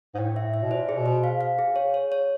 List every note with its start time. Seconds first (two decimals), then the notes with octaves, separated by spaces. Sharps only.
0.14 G#2
0.18 A2 G5
0.36 E5
0.54 E5
0.63 B2
0.71 A#2 C5
0.89 G#4
0.97 B2
1.06 C5
1.24 F5
1.41 F5
1.59 G#4
1.76 C#5
1.94 C#5
2.12 C#5